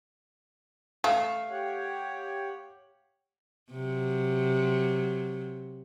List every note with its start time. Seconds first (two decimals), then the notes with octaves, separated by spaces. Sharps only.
1.04 A3 F5
1.50 G4 C#5 F#5
3.71 C3 F#3